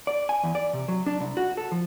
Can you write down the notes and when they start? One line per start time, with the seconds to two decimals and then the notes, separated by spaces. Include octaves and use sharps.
0.07 D5
0.29 G#5
0.43 E2
0.55 D5
0.73 C3
0.88 F#3
1.06 D4
1.20 C2
1.37 F#4
1.57 A4
1.72 F3